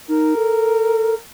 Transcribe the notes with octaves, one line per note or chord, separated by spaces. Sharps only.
D#4 A#4
A4